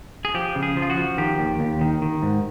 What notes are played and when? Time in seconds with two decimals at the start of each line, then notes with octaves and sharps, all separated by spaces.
0.25 G#4
0.34 F3 G4
0.56 C#3
0.63 G#4
0.77 F3
0.82 F4
0.90 F#4
0.97 F3
1.18 D#3 G4
1.39 D#2
1.60 D#2
1.81 D#3
2.02 D#3
2.23 G#2